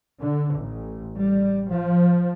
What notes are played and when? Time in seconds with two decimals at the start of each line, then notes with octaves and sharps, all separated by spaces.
0.21 D3
0.56 A1
1.18 G3
1.70 F3